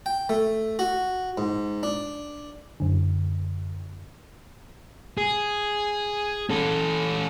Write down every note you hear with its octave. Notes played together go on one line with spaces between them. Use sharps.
G5
A3
F#4
G#2
D4
F#2 D3
G#4
C#4 A4